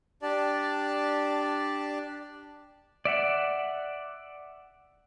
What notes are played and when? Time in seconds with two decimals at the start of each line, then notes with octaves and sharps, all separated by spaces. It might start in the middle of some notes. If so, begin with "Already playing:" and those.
0.22 D4 G4 D5 A5
3.05 D5 E5 F#5